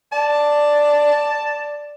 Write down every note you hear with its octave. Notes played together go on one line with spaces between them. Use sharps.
D5 A5